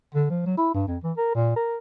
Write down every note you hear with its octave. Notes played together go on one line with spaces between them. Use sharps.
D3
F3
F#3
E4
G2
F2
E3
A#4
A#2
A#4